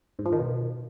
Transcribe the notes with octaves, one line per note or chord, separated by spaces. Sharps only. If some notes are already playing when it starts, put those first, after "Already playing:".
G#2
F3
D#3
B2